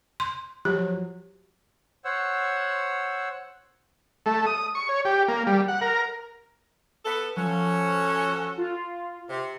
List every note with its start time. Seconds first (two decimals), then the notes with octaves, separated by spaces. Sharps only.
0.20 C6
0.65 F3 F#3 G4
2.04 C5 C#5 F#5 E6
4.26 A3
4.46 D#6
4.75 C#6
4.89 C#5
5.05 G4
5.28 A#3
5.47 G3
5.68 F#5
5.81 A#4
7.04 B3 A4
7.37 F3 C#4 F#4 A4
8.58 F4
9.28 C3